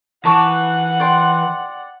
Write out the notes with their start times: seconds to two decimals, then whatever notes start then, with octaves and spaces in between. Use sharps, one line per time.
0.25 E3 F#5 A5 C#6 D6
1.00 D5 G5 C6